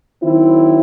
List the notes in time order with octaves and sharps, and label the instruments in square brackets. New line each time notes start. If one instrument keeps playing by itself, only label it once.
[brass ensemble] D#3 F#3 C4 E4